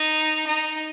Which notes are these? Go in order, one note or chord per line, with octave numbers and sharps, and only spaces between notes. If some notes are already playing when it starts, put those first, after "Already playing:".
Already playing: D#4
D#4